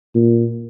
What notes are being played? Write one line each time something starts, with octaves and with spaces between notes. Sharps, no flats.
A#2